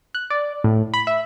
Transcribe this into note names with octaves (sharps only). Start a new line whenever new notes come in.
F#6
D5
A2
B5
E5